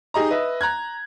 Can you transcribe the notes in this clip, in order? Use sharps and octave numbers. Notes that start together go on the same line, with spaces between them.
D#4 G4 G#4 D#5 A#5
B4 D#5 E5
A#5 F#6 G#6